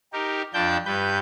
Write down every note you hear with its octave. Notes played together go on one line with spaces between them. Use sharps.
D#4 G4 A#4
F2 F3 D4 G5 A5 G6
G2 B4 G6